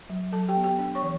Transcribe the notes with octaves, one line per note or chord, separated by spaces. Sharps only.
F#3
F#3 A4 A5
G4 G5
B3
G4 G5
D4
C#5 C#6
E3